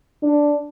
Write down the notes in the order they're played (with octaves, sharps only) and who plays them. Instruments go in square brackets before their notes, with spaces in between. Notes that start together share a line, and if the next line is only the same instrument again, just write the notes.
[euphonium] D4